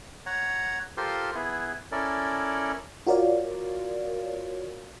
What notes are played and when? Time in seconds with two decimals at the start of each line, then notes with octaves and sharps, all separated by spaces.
0.26 C#5 F#5 A#5
0.97 F4 G4 A4 A#4 C5 C6
1.35 B3 E4 G#4
1.92 C#4 E4 A4 A#4 D5
3.07 F4 F#4 A#4 C#5 D5 F5